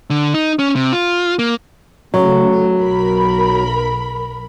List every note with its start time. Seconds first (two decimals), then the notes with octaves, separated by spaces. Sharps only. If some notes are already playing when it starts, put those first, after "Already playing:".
0.10 D3
0.34 D#4
0.59 C#4
0.75 C3
0.93 F4
1.39 A#3
2.14 C#3 F#3 A3
2.78 B1 A#4 B5